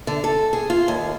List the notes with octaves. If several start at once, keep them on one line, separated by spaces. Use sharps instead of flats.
D3
A4
G#4
F4
D#2